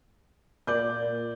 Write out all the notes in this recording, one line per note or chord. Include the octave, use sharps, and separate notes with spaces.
A#2 D5 D6 G6